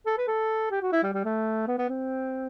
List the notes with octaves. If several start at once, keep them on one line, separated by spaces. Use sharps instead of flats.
A4
B4
A4
G4
F#4
E4
G3
G3
A3
B3
B3
C4